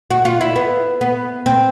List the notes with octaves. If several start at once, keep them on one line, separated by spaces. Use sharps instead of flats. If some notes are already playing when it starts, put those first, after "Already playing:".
F#4
F4
E4
B3
B3
C4